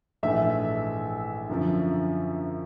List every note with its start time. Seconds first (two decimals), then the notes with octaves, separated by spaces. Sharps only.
0.23 A#1 G#2 E3 A3 E5
1.49 F#2 D3 F3